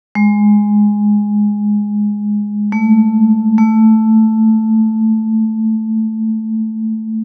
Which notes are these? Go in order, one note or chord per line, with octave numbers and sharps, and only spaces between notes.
G#3
A3
A3